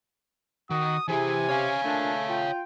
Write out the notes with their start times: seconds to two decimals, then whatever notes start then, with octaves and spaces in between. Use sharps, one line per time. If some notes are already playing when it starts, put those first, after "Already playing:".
0.71 D#3 F#4 D#6
1.09 C3 E3 E4 G#4 G#5
1.49 C#4 C#5 F5
1.84 A#2 A3 D4
2.29 F4 G5